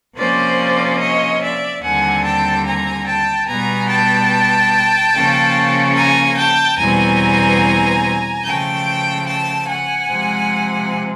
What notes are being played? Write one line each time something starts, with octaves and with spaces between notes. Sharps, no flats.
C3 F3 A#3 C#4 C5 D5
C#5 D#5
D5 E5
D#2 D3 G3 C4 F#5 G#5
G5 A5
G#5 A#5
G5 A5
B2 G3 B3 G#5 A#5
G5 A5
C#3 F3 A#3 C#4
G#5 A#5
G5 A5
E2 B2 G3 C4 G#5 A#5
C#3 F3 A3 G5 A5
G5 A5
F#5 G#5
C3 F3 G#3